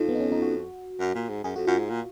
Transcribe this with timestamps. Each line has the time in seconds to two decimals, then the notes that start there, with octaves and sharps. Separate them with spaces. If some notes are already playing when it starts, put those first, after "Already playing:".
Already playing: F2 D#4 F4
0.09 B3
0.15 D#4
0.20 C#4
0.32 D#4
0.42 F#4
1.00 F#2
1.15 A#2
1.29 G#2
1.44 F#2 G#4
1.56 F2 F#4
1.67 F#2 F4
1.78 G#2
1.90 A#2